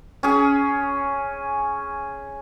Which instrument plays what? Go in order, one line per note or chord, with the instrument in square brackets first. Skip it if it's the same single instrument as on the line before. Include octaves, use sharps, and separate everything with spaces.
[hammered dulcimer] C#4 G#4